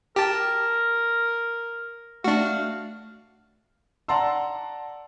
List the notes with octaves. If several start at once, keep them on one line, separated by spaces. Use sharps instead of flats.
G4 A#4 A5
A3 D4 F#4 F5
D5 F#5 A5 A#5 C6 E6